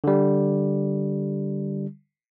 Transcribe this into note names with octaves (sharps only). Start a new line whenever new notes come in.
D3 G3